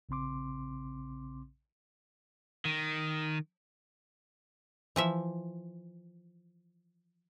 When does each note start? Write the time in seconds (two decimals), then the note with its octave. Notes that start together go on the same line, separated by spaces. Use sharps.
0.09 A#1 C#3 C4 C6 D6
2.65 D#3
4.96 E3 F3 E5